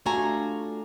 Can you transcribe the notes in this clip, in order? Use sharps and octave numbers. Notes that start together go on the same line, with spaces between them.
A3 D4 F4 F#4 G#5 A#5